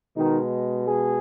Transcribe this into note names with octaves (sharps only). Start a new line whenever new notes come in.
B2 D#3 G#3 D#4
G#3 G#4